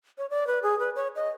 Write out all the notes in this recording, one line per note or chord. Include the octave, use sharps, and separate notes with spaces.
C#5
D5
B4
G#4
B4
C#5
D#5